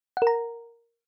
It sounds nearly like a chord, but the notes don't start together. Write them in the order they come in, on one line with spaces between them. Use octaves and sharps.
F#5 A#4 A#5